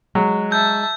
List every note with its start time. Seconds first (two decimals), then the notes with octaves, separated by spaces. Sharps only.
0.15 F#3 G#3
0.52 E5 A5 G6